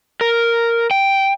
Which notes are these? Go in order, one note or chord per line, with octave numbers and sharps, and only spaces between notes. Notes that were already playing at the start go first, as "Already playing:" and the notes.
A#4
G5